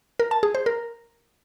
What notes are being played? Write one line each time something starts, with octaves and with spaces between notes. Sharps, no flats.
A#4
A5
G#4
C5
A#4